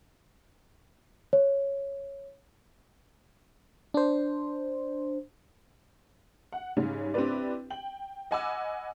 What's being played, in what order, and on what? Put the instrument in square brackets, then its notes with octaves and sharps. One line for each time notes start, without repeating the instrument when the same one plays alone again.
[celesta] C#5
[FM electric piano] D4 C5
[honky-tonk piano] F#5
G#2 C#3 G3 C#4
C4 D4 E4 G4 B4 D5
G5 F#7
D#5 F#5 G#5 B5 D6 E6